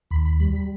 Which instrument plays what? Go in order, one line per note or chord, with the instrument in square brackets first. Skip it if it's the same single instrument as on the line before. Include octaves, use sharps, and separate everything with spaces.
[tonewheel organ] D#2 B5
B5
G3 B5
B5